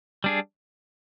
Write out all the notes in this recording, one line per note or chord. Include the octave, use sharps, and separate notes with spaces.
G3 D4 G#4